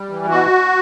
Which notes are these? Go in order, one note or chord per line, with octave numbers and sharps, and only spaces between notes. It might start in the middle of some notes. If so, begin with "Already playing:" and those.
Already playing: G3
E3
B2 F#4